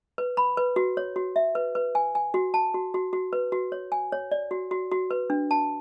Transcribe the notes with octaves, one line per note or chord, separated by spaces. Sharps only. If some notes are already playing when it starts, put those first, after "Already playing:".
B4
B5
B4
F#4
C#5
F#4
E5
B4
B4
G#5
G#5
F#4
A5
F#4
F#4
F#4
B4
F#4
C#5
G#5
C#5
D5
F#4
F#4
F#4
B4
D4
A5